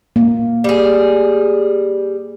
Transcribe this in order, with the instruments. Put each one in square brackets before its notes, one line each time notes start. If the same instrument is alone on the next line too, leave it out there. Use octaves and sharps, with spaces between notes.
[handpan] A#3
[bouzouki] G3 G#4